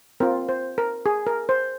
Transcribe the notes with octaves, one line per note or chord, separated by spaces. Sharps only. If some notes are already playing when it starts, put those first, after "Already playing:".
C4 F4 A#4
C5
A#4
G#4
A#4
C5